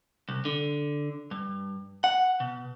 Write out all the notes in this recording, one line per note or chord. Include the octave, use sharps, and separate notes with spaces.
C2
D3
G2
F#5
B2